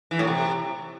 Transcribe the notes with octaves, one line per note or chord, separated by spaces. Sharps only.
E3
A2
C3